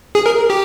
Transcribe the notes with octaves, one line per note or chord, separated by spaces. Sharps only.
G#4
A#4
G4